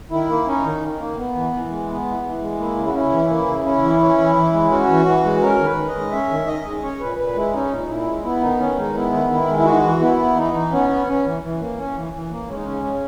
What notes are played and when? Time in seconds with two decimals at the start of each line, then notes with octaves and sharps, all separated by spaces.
0.11 D#3 E4
0.29 A#3
0.47 C#4 D#4
0.64 D#3
0.82 D#3
1.00 A#3
1.17 B3
1.35 E3
1.53 E3
1.71 G#3
1.88 B3
2.06 E3
2.23 E3
2.41 G#3
2.58 A#3 E4
2.76 C#3
2.87 F#4
2.94 C#4 E4
3.12 E3
3.29 A#3
3.47 C#3
3.65 C#4
3.83 E3
4.00 C#4
4.18 E3
4.35 E3
4.53 G#3
4.71 C#4 F#4
4.88 E3
5.06 E3
5.24 G#3
5.42 C#4 A#4
5.59 D#3
5.65 B4
5.77 D#3
5.88 D#5
5.95 G#3
6.12 C#4 E5
6.30 D#3
6.47 D#3 D#5
6.65 G#3
6.77 D#5
6.83 C#4 C#5
7.00 A#2 B4
7.18 A#2 B4
7.36 G#3 E4
7.54 C#4 D#4
7.71 A#2
7.89 A#2 E4
8.07 G#3
8.24 B3 E4
8.42 D#3 D#4
8.59 D#3 C#4
8.77 G#3 D#4
8.95 B3 E4
9.13 D#3
9.30 D#3 E4
9.48 G#3
9.58 E4
9.65 E3 F#4
9.83 E3
10.01 B3 E4
10.19 B3
10.36 E3 D#4
10.54 E3
10.71 B3 C#4
10.89 B3
11.07 C#4
11.25 E3
11.43 E3
11.60 A#3
11.77 C#4
11.95 E3
12.13 E3
12.31 A#3
12.48 G#3 C#4
12.56 D#4
12.64 C#3 C#4
12.84 C#3